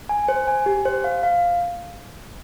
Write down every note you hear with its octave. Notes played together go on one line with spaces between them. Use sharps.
G#5
C5
G#5
G4
C5
F5
F5